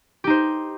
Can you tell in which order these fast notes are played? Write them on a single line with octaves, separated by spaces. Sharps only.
G4 D#4 C5